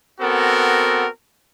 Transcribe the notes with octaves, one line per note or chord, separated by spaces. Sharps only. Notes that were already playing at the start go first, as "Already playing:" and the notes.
B3 C4 F#4 A4 A#4